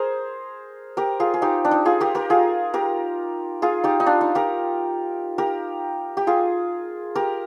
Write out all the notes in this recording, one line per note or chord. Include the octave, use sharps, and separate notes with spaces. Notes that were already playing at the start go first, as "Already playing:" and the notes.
Already playing: G#4 A#4 C5
G4 A#4
F4 G#4
G#4
D#4 G4
D4
D#4
F4 G#4
G4 A#4
G4 A#4
F4 G#4
G4 A#4
F4 G#4
D#4 G4
D#4
D4 F4
D#4
G4 A#4
G4 A#4
G4
F4 G#4
G4 A#4